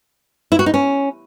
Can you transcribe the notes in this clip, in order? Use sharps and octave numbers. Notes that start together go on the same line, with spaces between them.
E4
F#4
D#4
C#4